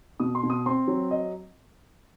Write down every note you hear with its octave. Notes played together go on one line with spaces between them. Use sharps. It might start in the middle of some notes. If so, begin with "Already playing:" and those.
B2 D#6
C6
B2
D#6
C4 C6
F#3
D#5